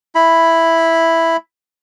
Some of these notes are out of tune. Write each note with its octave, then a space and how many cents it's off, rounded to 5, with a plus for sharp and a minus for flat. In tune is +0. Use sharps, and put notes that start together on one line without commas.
E4 +0 B5 +0